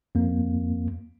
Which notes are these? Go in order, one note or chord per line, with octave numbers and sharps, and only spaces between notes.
F2 A#3